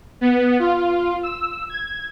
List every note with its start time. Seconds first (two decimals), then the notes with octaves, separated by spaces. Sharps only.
0.21 B3
0.59 F4
1.23 E6
1.69 G#6